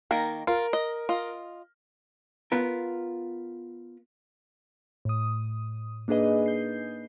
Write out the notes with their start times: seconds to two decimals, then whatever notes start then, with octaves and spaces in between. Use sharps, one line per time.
0.11 D#3 A#3 A#4
0.47 F4 A#4
0.73 D#5
1.09 F4 D#5
2.52 B3 F4 A#4
5.05 A2 D#6
6.08 A#3 D4 D#4 G#4 B4 D#5
6.46 G6 C7